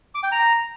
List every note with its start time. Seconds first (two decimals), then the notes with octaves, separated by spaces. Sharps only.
0.15 D6
0.23 G5
0.32 A#5